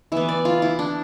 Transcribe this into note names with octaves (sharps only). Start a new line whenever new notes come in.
E3 B3 E5
D5
F4
E4
D4